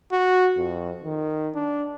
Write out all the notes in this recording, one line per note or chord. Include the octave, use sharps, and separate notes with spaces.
F#4
F2
D#3
D4